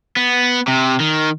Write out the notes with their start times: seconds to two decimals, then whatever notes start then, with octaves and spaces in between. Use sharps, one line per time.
0.17 B3
0.68 C3
1.00 D#3